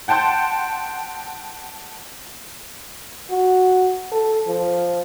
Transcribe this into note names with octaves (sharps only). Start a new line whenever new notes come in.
F#5 G5 A5 C6 G6
F#4
A4
F3